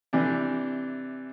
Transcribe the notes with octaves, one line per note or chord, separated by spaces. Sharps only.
C3 E3 D4